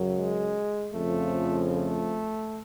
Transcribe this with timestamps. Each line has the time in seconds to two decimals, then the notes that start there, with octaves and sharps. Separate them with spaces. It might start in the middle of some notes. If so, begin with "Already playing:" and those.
Already playing: F#2 C#3 F#3
0.13 G#3
0.94 F2 C#3 F3 A3
1.75 A3